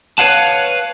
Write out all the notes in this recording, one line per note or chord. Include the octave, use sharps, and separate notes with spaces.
B4 C#5 F5 F#5 A5